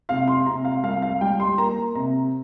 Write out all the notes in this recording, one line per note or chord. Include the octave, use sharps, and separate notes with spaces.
C3 F5
C6
C3 A#5
F5
C2 F5
F5
G3 G5
C6
A#3 A#5
C3 A#5